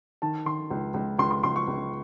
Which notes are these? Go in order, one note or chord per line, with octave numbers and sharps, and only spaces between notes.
D#3 A5
D#3 C6
C#2
C#2
C#2 C6
C6
C#2 C6
C#6
C#2